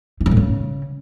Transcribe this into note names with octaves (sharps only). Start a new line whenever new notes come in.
D#3
G2
A2
C#3